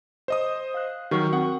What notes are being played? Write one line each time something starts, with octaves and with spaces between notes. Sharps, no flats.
C5 D#5 D#6
F5 F#6
D#3 F#3 F#4 A#4 C#6
C4 A#4 F#5 D#6